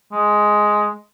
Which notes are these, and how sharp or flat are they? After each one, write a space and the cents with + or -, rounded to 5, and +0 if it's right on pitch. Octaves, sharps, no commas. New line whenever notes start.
G#3 +5